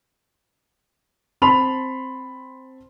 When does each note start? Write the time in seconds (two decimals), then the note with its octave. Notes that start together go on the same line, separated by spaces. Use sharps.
1.42 C4 A5 B5 C6 F7